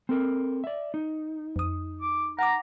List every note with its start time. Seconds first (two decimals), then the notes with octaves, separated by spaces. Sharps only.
0.09 C4 A4 A#4
0.64 D5 E5
0.94 D#4
1.56 F2 D#6
2.01 D6
2.39 F#5 A#5 D6